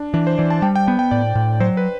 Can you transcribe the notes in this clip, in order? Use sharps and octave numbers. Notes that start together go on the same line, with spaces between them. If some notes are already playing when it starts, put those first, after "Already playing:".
Already playing: D4
E3 D4
C5
E3 D5
A5
G3 G5
G5
B3 G5
G5
A2 D5
A2
F#3 C5
B4